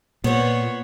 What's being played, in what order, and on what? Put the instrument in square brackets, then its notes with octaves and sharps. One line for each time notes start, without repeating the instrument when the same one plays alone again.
[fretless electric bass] A#2 [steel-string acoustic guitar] B3 C5 [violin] C#5 F#5